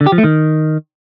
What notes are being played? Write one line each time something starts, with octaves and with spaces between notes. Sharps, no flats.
D3
G4
F3
A3
D#3